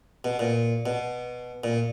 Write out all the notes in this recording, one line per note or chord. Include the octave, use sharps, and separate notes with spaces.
B2
A#2
B2
A#2